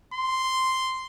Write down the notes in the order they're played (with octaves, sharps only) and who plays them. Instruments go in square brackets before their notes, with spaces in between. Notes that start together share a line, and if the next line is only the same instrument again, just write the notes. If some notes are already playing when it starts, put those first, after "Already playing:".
[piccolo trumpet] C6